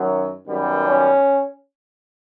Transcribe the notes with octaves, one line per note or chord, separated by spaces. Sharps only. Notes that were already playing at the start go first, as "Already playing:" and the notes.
Already playing: F#2 D#3 F#3
F#2 D#3 G3 B3
C#4